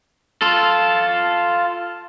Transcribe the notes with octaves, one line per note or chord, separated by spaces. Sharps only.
F4 A4